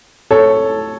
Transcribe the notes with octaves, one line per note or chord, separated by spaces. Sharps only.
A4 C#5